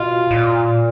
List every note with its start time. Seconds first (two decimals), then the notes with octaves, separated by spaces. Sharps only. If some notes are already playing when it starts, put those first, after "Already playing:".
Already playing: B2 F4
0.31 A2
0.34 A#2